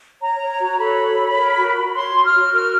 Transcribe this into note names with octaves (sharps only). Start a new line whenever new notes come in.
C#5 A#5
C#5
F#4
A4 B5
C#5
C#5
A#4
F#4
F#4
C#5 C6
F#4
F6
F#4
A#4 F6